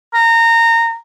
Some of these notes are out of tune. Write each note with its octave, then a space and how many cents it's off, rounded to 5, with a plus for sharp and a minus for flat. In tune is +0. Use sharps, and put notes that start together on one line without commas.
A#5 -20